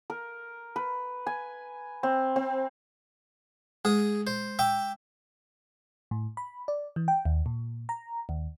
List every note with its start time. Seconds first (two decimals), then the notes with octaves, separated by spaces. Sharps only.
0.10 A#4
0.76 B4
1.26 G#5
2.03 C4
2.36 C4
3.85 G#3 G#4 D#6
4.27 C5
4.59 E5 G5 D6
6.11 A2
6.37 B5
6.68 D5
6.96 E3
7.08 G5
7.25 D#2
7.46 A#2
7.89 A#5
8.29 D#2